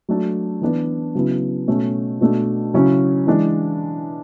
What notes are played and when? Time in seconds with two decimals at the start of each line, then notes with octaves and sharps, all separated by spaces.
0.09 F#3 A3 D4
0.61 E3 B3 D4
1.15 C#3 F#3 B3 E4
1.68 B2 A3 C#4
2.21 B2 A3 D4
2.74 C#3 F#3 C#4 E4
3.27 E3 G#3 D4